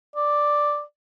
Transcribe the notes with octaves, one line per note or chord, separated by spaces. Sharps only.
D5